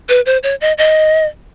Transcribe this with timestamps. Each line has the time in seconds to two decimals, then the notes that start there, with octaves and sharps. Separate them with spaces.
0.09 B4
0.26 C5
0.43 C#5
0.61 D#5
0.78 D#5